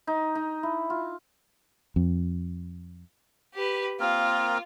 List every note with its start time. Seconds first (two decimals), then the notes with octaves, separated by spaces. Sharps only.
0.07 D#4
0.35 D#4
0.63 E4
0.90 F4
1.96 F2
3.54 G4 B4
4.00 A#3 C4 F4 A#4